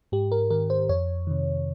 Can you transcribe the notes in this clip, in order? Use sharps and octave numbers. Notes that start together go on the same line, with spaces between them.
G#2 G4
A#4
D#3 A#4
C5
F2 C#5
C3 D#3